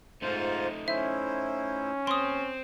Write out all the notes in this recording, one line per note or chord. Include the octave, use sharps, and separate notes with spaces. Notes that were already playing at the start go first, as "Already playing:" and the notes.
G#2 A3 D#4 F4 C5
C#4 E4 C5 E5
D#2 C4 C6 D#6